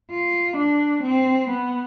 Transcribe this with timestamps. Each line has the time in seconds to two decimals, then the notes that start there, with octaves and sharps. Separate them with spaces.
0.11 F4
0.57 D4
1.03 C4
1.50 B3